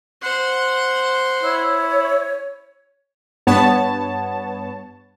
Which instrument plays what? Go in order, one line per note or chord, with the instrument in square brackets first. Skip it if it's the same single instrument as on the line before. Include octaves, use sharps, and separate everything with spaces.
[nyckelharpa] C5 F#5
[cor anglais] E4 [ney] C#5
[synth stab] G2 B3 C#5 A5